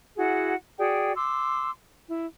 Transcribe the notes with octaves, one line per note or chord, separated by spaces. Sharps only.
E4 F#4 G#4 F#5
F#4 G#4 D5 G5
C6 D6 E6
E4